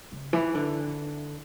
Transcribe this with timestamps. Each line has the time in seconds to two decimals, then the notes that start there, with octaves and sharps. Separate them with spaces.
0.12 C#3
0.33 E3
0.55 D3